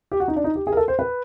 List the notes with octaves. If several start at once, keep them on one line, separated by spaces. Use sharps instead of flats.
G4
F#4
D#4
D4
D#4
G4
G#4
A#4
A4
C5
B4